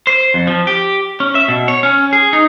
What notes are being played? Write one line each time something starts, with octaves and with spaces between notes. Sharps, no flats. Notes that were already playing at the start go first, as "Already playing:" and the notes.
C5
F2
F3
G4
C#4
E5
B2
C#5
C#4
G#4
D#4